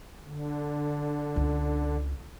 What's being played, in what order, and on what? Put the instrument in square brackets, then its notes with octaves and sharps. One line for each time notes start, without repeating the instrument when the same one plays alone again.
[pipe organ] D3
[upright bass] C#2